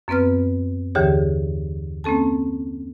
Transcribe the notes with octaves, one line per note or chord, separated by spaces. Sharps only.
F#2 B3 C4 B4 F6
D#2 D3 E3 G4 G#4 C#5
A#3 C4 C#4 A4 A5